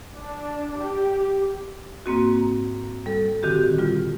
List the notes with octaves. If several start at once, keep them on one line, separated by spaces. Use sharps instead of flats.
D4
G4
G#2 A#3 C4 F#4
A#5
G3 A4
A#2 D3 D#3 C4 F#4 G4
G3 F4